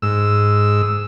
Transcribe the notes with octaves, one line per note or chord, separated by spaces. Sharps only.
G#2 E6